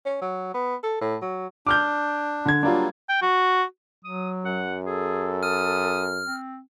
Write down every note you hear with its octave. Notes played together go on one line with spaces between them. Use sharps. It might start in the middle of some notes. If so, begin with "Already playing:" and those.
C#4
F#3
B3
A4
A2
F#3
D4 D6 F6 G6
D3 G#6
F#3 G3 A#3 D4 F4
G5
F#4
F#3 D#6
F#2 F#5
G#4 A4
D#6 F6
C4